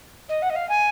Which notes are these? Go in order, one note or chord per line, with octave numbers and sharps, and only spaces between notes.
D#5
F#5
D#5
F5
G#5